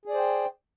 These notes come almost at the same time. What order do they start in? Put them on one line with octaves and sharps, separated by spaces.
G#4 D5 C5 G5